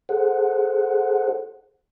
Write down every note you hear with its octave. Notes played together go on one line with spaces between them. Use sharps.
G#4 A4 C5 F#5